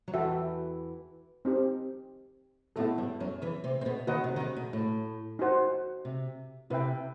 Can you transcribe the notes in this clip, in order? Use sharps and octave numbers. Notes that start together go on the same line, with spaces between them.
F#3
E2 E3 F#4 A4 E5 G5
C4 D#4 G4
A2 A3 B3 E4 A4
G2 G3
F#2 F#3
E2 E3
C3 C4
C4
B2 B3
D#2 D#3 F#4 B4 D#5 F#5
C3
D#3
C3
B2
A2
D#4 F#4 C5 F#5
C3
C3 E4 B4 E5 G5